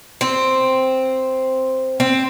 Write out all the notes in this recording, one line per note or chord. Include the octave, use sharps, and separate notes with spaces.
C4
C4